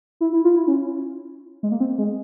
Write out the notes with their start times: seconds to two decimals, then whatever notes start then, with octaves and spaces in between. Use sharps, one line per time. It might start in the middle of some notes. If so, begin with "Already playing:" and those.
0.21 E4
0.33 E4
0.44 F4
0.56 E4
0.67 C#4
1.63 G#3
1.72 A#3
1.80 C4
1.98 G#3